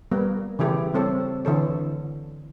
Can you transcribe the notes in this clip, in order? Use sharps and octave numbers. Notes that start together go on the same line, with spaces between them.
G3 A#3 B3 A#4
C#3 E3 E4 G4 A4
G3 C4 A4 C#5
D3 E3 A4 C#5